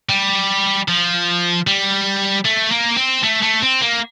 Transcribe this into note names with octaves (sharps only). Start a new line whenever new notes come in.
G3
F3
G3
A3
A#3
C4
A3
A3
C4
A#3